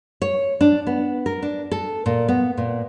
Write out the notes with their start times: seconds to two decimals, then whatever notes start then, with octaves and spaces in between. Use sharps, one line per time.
0.22 C#5
0.61 D4
0.87 B3
1.26 A#4
1.42 D4
1.71 A4
2.06 A#2
2.28 B3
2.58 A#2